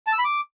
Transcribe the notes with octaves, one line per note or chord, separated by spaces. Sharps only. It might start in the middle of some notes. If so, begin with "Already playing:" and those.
A5
E6
B5
D6